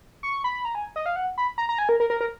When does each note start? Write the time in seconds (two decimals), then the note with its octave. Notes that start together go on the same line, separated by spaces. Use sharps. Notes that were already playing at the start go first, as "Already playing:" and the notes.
0.23 C#6
0.44 B5
0.65 A#5
0.75 G#5
0.96 D#5
1.06 F5
1.16 F#5
1.38 B5
1.58 A#5
1.69 A#5
1.79 G#5
1.89 A#4
2.00 A#4
2.10 A#4
2.21 A#4